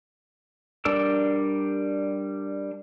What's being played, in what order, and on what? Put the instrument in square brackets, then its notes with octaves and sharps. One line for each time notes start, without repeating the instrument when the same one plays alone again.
[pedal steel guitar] G3 D4 A#4 E6